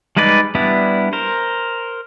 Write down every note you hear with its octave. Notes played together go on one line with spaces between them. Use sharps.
G3 G#3 D#4 B4 D5
G3 B3 D4 E4
A#4 C5